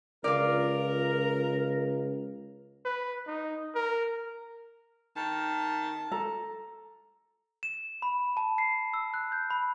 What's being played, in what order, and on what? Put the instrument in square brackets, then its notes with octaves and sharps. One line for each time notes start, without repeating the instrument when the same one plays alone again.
[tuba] C#2 [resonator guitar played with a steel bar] F4 D5 [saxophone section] A#4
[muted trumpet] B4
D#4
A#4
[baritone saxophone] D#3 [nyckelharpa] A5
[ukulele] A4 A#5
[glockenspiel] E7
B5
A5
C7
E6
F#6
G6
B5